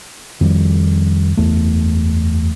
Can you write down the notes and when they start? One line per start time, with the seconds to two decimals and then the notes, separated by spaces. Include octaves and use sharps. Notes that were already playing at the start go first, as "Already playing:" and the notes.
0.41 F2 D#3 G3
1.37 F#1 E2 A3